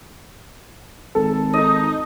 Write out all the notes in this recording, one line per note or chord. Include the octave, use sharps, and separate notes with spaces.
G#1 A4
D#4 D#5